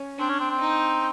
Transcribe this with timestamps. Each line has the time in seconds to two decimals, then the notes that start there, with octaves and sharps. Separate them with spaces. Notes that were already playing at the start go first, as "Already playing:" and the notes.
Already playing: C#4
0.19 C4 D4
0.29 C#4
0.40 C4
0.50 C4
0.61 D#4